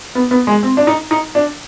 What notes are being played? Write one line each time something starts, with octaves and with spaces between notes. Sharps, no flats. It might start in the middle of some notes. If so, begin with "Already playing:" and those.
B3
B3
G#3
C4
D4
D#4
D#4
D4